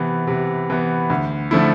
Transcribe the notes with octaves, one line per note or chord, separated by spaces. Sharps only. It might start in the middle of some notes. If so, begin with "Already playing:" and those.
Already playing: C3 E3 B3
C3
E3 B3
D2
D3 F3 A3 E4